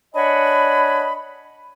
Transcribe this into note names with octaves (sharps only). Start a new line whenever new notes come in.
D4 C#5 D#5 F#5 G#5 B5